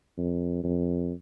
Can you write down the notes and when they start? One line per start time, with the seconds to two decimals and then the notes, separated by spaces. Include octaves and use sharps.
0.18 F2
0.64 F2